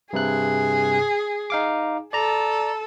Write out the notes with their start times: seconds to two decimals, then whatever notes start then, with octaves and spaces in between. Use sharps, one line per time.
0.13 G2 C3 G#4 F#6
1.50 D#4 F5 D6
2.13 A4 D5 A#5